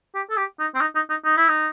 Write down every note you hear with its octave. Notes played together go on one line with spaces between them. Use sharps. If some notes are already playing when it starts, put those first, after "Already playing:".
G4
A4
G4
D#4
C4
D#4
D#4
D#4
D#4
E4
D#4